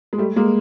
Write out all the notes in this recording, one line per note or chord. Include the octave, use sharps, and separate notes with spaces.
G#3
G3 A3
G#3 A#3